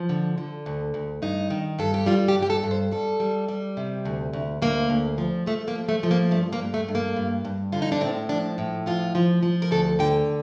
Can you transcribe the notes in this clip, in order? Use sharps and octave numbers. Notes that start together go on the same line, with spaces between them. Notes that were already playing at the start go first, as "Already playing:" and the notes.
Already playing: F3
D3
D3
D2
D2
G2 D#4
D#3
G2 A4
G4
G3 F4
G4
G2
G4
A4
G2
C5
G3 A4
G3
G3
C3
D2
D2
D2 A#3
D2
F3
F3 A3
A#3
F3
A3
F3
A#3
G2 A3
A#3
G2
A3
G2
A#3
G2
G2
D3 F4
D#4
D4
A2 C4
F3 D4
A2
F3 F4
F3
F3
A#4
D2 A4
D3 G5